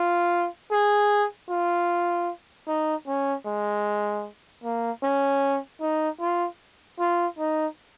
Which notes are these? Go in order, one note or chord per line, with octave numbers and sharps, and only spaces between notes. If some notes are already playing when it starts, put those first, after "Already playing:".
Already playing: F4
G#4
F4
D#4
C#4
G#3
A#3
C#4
D#4
F4
F4
D#4